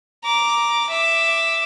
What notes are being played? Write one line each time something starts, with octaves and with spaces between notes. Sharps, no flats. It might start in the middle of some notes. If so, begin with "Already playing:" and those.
A#5 D6
E5 D6